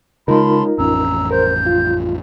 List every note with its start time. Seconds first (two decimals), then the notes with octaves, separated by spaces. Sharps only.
0.28 C#3 G#3 D#4 F4 A#4 A5 B5 C6
0.78 A1 F2 C#4 A#5 E6
1.31 A#4 C5 G6
1.66 F4